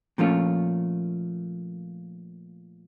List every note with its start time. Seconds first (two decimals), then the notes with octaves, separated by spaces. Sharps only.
0.18 A#2 F3 A3 C#4 F4